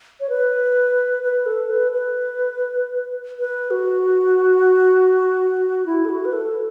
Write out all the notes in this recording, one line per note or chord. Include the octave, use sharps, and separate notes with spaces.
C#5
B4
B4
A4
B4
B4
B4
F#4
E4
A4
F#4
B4
A4